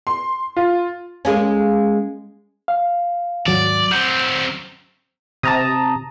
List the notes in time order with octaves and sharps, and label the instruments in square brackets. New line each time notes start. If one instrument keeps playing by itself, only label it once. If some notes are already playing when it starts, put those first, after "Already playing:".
[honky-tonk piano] C6
F4
[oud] G#3 A#3 C#4
[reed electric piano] F5
[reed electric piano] D#2 G#2 F#3 [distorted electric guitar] D5
[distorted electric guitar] F#3 C4 [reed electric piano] G6
[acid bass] C3 [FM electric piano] A5 A#5 D#6